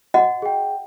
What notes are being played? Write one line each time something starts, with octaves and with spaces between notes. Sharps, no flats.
F#4 D#5 F#5
G#4 G5